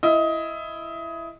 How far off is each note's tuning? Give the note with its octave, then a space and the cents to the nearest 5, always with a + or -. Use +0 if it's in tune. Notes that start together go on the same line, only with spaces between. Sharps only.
E4 +15 D#5 +20